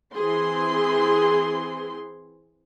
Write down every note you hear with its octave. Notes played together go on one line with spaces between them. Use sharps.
E3 C4 G#4 C6